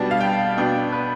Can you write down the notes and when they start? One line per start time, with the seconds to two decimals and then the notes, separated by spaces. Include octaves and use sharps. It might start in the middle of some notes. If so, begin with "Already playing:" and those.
Already playing: B2 G3 B3 D4 A5
0.11 F5
0.20 G5
0.57 B2 B3 D4 G5
0.92 B4